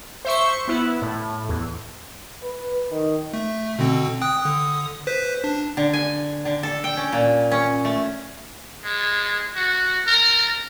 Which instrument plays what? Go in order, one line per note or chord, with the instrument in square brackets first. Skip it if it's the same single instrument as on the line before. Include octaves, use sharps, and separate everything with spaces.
[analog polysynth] C5 E5 C#6
B3 E4
A2
E2
[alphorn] B4
D#3
[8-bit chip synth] A3
B2 D3 C4
G5 D#6 F#6
D3 D#6
B4 C5 B6
D4
[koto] D3
G#5
D3
A4
G5
C#4
A#2
C#4
A3
[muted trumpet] G#3
F#4
A#4